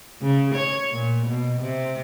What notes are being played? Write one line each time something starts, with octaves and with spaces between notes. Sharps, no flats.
C#3
C#5
A#2
B2
C3